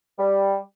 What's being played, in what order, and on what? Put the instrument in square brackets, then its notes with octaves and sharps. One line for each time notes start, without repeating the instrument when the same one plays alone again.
[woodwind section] G3